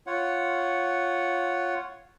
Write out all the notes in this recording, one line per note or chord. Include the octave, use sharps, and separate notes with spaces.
F4 C#5 F#5